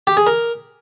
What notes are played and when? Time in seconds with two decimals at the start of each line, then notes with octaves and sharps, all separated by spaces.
0.07 G4
0.17 G#4
0.27 A#4